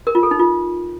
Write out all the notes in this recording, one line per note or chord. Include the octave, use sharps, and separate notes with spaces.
A#4
F4
A4
D#4
F4